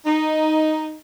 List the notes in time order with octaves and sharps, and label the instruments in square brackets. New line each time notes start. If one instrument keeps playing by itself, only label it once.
[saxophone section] D#4